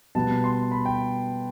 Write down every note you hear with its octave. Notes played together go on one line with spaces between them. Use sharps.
B2 G3 B3 A5
C6
B5
G5